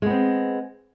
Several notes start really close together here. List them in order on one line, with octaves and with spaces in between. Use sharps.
G#3 B3 C4